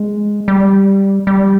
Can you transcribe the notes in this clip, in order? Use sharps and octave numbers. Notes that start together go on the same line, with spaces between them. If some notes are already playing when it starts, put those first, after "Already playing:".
Already playing: G#3
G3
G3